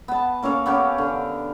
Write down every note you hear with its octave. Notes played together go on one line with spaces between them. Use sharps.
B3 A5
A#3 C#4 A4 F5
B3 C#4 G4 A#4
D3